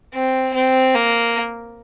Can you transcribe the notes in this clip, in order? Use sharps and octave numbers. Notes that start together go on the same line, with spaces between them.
C4
C4
A#3